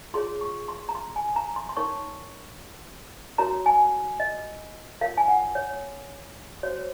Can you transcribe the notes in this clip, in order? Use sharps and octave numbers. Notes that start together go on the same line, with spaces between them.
F4 G#4 C#5 C6
C#6
C6
A#5
C6
G#5
A#5
C6
C6
D#4 A#4 C#5 C#6
F#4 A#4 C#5 A#5
G#5
D#5
F4 A#4 C#5 F5
G#5
F#5
C#5
F#4 C5 C#5